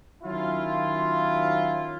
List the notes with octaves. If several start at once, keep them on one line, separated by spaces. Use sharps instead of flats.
D#3 F#3 C#4 E4 F4